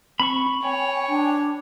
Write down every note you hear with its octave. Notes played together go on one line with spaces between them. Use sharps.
C4 B5 C#6
C#5 G5 G#5
D4